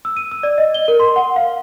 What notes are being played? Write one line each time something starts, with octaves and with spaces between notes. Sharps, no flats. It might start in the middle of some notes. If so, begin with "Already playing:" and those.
E6
D#7
E6
D5
D#5
G7
A#4
C6
F#5
F5